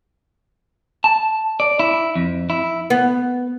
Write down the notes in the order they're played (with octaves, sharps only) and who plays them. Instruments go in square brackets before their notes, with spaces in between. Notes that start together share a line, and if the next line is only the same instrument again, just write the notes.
[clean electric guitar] A5
D5
E4
F2
E4
[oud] B3